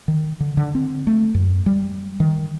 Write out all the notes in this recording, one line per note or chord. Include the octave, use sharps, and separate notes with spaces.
D#3
D3
D3
C4
A3
F#2
G3
D#3